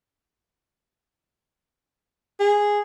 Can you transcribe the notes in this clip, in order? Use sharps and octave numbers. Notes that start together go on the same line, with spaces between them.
G#4